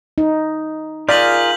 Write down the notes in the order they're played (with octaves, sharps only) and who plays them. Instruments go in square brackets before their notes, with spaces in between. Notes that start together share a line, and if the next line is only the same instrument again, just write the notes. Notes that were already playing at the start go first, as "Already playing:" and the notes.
[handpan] D#4
[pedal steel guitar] F4 G#4 A#4 [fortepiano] D5 [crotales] G6 B6 F#7